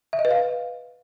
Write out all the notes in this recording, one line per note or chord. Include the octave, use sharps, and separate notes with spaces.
E5
D#5
B4
F5